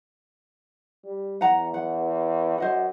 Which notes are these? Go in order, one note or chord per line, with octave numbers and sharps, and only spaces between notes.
G3
E2 F#5 A#5
F#5
F#2 C5 D#5 F#5